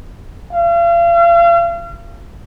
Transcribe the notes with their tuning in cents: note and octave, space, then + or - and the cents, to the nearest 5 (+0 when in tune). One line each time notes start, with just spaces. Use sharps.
F5 -40